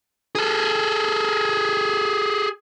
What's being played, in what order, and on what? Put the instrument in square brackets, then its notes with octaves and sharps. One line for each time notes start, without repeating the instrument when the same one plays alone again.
[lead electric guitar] G#4 A4